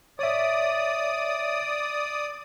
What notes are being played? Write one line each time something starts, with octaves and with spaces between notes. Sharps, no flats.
C#5 D5 E5 D#6